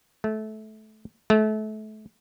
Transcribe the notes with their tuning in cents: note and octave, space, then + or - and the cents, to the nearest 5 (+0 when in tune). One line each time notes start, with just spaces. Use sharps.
A3 -20
A3 -30